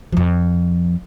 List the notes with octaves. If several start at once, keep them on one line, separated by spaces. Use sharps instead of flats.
F2 F3